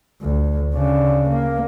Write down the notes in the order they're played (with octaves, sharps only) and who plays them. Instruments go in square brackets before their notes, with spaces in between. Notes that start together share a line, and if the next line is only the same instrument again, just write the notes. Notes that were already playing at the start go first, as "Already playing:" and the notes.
[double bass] D2
C#3 D4
A#3